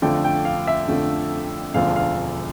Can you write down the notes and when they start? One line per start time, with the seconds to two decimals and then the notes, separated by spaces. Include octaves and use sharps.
0.02 F2 D3 F3 A3 G5
0.24 G5
0.45 F5
0.67 E5
0.89 F2 D3 F3 A3
1.74 E1 D2 D3 F3 A3 F5
1.96 F5